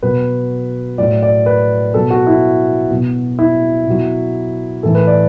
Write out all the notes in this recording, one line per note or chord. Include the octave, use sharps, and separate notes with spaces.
B2 F#3 B4
A2 F#3 D5
D5
B4
B2 F#3 A4
F#4
E4
B2 F#3
E4
B2 F#3
A2 E3 A4
B4
D5